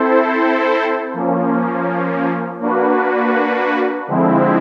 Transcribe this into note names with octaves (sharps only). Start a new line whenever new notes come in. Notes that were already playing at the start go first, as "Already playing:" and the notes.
Already playing: C4 E4 A4 C5
F3 A#3 C#4
A#3 D4 F#4 B4
D3 F3 G#3 C4 E4